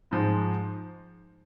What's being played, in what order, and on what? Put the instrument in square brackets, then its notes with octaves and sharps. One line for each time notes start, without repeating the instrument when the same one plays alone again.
[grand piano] G#2 F3 G#3